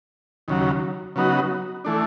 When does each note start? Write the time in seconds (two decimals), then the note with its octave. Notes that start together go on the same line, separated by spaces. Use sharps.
0.48 D#2 C#3 F#3
1.16 C#3 F#3 B3 D#4 F#4
1.84 E3 A3 D4